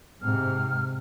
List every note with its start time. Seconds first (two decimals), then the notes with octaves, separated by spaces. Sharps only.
0.22 G#2 C3 F6